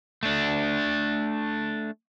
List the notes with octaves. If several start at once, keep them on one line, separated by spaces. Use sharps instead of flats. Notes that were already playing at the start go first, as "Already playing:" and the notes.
A3 D4